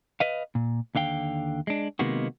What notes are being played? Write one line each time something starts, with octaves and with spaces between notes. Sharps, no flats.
B4 D#5 F5
A#2
D#2 D3 F5 G5
G#3 D4
C3 D#3 G#3 A#3 B3 F#4